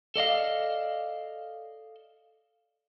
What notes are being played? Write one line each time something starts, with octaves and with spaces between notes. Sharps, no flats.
A4 D5 D#5 F5